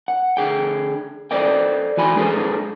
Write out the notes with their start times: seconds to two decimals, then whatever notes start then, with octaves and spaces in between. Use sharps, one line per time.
0.08 F#5
0.37 D3 G#4 G5
1.31 A4 C5 D5 D#5 G5
1.97 E3 F#4 G#5 B5 C6
2.16 G#3 D4 G#4 A4 B4 C5